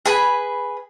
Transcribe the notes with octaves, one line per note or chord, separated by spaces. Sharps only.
G#4 B4 G#5 B5